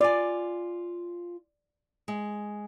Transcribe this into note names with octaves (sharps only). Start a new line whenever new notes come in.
F4 D5 G#5
G#3